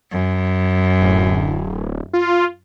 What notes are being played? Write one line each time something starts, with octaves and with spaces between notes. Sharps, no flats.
F#2
D1
F4